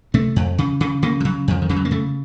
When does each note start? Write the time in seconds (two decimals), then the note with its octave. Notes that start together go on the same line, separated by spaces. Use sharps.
0.14 C3 A3
0.36 F2
0.58 C#3
0.80 C#3
1.02 C#3 A#3
1.20 F3
1.25 C#3 F#3
1.48 F2 F3
1.62 D#3
1.69 C#3 F3
1.76 F#3
1.85 A#3
1.91 C#3 A3